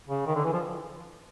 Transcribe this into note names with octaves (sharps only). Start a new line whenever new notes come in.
C#3
D#3
D3
E3
F3